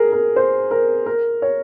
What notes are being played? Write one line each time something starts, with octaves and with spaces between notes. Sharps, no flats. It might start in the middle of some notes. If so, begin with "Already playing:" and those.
Already playing: G#4 A#4
A#4
C5
A#4
A#4
C#5